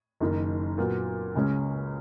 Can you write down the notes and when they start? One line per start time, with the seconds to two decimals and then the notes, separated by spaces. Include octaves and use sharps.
0.20 F#1 F#2 D#3
0.78 A#2 F#3 B3
1.35 C#2 C#3 G#3 C#4